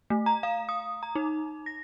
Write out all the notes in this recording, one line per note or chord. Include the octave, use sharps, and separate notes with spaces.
A3
A#5
F5
D#6
A#5
D#4
A#6